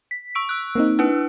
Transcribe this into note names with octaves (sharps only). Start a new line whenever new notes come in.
B6
C#6 E6 D7
E6 F#6
A#3 C4 D#4
D4 E4 B4